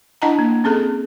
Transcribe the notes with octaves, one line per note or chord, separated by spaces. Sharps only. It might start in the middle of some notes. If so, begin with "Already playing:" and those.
D4 E4 D#5 F#5 A5 A#5
A#3
C4 C#4 G#4 A4